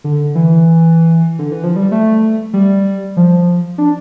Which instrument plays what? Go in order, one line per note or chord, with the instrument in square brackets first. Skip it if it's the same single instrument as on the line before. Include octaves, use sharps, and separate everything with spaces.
[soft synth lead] D3
E3
D3
E3
F3
G3
A3
G3
F3
D4